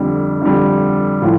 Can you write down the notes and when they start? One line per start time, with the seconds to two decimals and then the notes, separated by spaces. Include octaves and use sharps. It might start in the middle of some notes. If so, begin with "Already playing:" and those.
Already playing: F2 D3 G3
0.41 F2 D3 G3
1.22 A2 F3